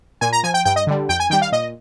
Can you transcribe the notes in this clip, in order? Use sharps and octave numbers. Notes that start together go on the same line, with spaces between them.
A#2 G#5
A#5
F3 G#5
G5
G2 G5
D#5
D3 G3
F2 G5
G#5
D#3 G3 G5
F5
A#2 D#5